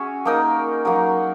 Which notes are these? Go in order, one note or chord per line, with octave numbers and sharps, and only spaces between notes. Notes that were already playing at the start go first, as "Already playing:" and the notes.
Already playing: C#4 F#4 G#4 C#5 E5
A#3 D#4 A#4
F#3 A#3 D#4 F#4